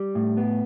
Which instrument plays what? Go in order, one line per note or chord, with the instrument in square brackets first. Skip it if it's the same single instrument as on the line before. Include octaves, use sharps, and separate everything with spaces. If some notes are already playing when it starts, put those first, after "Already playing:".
Already playing: [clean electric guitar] G3
A2
B3